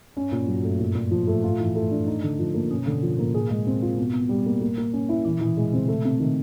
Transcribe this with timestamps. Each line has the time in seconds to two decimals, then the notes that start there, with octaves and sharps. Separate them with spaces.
0.17 G2 C#4
0.32 A#2
0.38 G2
0.48 F#3
0.54 G2
0.59 F#2
0.64 A3
0.79 F#2 A#2
0.95 A#2
1.01 G2
1.11 F3
1.17 A2
1.22 G#2
1.27 A3
1.43 A2 F4
1.60 E3
1.75 A3
1.91 D4
2.07 D#4
2.24 D3
2.39 F3
2.55 A#3
2.71 B2 C#4
2.86 D3
2.92 B2
3.02 F3
3.13 A2
3.19 A#3
3.34 A2 G#4
3.50 G#3
3.67 C4
3.82 F4
3.97 B2
4.13 B2
4.29 G3
4.46 A#3
4.61 A#3
4.78 A#3
4.93 C#4
5.09 E4
5.25 A#2 E3
5.38 A#2 E3
5.46 B2
5.57 G#3
5.68 C#3
5.73 C4
5.88 A3
6.05 C3
6.20 D#3